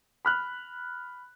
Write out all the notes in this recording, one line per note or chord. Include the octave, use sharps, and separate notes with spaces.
B5 F6 F#6